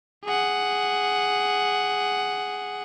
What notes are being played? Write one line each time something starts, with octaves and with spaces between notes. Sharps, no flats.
G#4 F#5